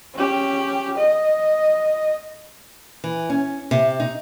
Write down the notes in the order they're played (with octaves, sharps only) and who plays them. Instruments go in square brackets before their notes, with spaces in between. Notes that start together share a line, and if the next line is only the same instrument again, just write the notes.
[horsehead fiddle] C#4 G4
D#5
[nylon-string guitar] E3
C#4
C3
D#4